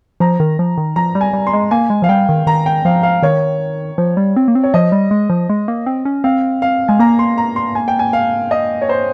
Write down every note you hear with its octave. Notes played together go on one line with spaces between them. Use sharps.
F3 A#5
D#3
F3
D#3
F3 A#5
G3
G#5
G3
C6
G#3
A#3 G#5
G#3
F3 F5
G3 G5
D#3
D#3 A#5
G5
F3 F5
F5
D#3 C#5
F3
G3
C4
A#3
C4
C#5
F3 D#5
G3
G#3
F3
G#3
A#3
C4
C#4
C4 F5
F5
G#3 G#5
A#3 A#5
C6
A#5
C6
G#5
G5
G#5
F5
D#5
C#5
C5